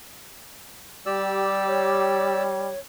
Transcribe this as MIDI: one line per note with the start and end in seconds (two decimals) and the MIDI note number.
1.06 2.72 55
1.06 2.43 67
1.06 2.43 74
1.06 2.43 88
1.68 2.79 73